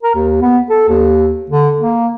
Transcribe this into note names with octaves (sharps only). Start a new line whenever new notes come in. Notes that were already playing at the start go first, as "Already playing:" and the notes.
A#4
D#2
B3
A4
D#2
D3
A#3